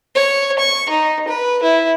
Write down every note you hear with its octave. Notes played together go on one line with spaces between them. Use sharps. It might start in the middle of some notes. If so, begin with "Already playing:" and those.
C#5
C#6
D#4
B4
E4